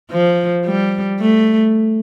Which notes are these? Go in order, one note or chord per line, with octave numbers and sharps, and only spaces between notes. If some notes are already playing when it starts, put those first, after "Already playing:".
F3
G3
A3